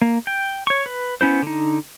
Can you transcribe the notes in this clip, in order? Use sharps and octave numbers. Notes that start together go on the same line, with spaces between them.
A#3
G5
C#5 C#6
B4
B3 C#4 E4 C5
D3 D#4